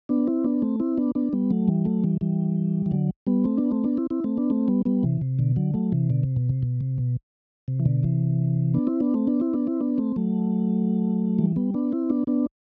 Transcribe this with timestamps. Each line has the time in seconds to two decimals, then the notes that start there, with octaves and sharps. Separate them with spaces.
0.09 B3 D4
0.27 C4 E4
0.44 B3 D4
0.62 A3 C4
0.80 C4 E4
0.97 B3 D4
1.15 B3 D4
1.33 G3 B3
1.51 F#3 A3
1.68 E3 G3
1.85 F#3 A3
2.04 E3 G3
2.21 E3 G3
2.86 E3
2.91 D3 F#3
3.27 G3 B3
3.44 A3 C4
3.57 B3 D4
3.71 A3 C4
3.84 B3 D4
3.97 C4 E4
4.10 C4 E4
4.24 A3 C4
4.37 B3 D4
4.50 A3 C4
4.68 G3 B3
4.85 G3 B3
5.03 C3 E3
5.22 C3
5.39 B2 D3
5.56 D3 F#3
5.74 F#3 A3
5.92 C3 E3
6.10 B2 D3
6.23 C3
6.36 B2
6.49 C3
6.63 B2
6.81 C3
6.98 B2
7.68 C3
7.80 E3
7.86 B2 D3
8.03 C3 E3
8.74 B3 D4
8.87 C4 E4
9.00 B3 D4
9.14 A3 C4
9.27 B3 D4
9.40 C4 E4
9.53 B3 D4
9.67 C4 E4
9.81 B3 D4
9.98 A3 C4
10.16 F#3 A3
11.39 E3 G3
11.56 G3 B3
11.74 B3 D4
11.92 C4 E4
12.10 B3 D4
12.27 B3 D4